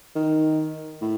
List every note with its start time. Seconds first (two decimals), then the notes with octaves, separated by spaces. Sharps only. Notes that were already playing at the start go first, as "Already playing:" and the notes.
0.16 D#3
1.02 A2